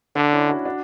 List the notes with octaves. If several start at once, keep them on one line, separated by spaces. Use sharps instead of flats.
D3 D4
C#4 E4
D4 F#4
D4 F#4